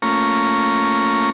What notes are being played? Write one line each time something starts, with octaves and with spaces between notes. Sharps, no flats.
A3 A#3 C#4 F4 A#5 C#6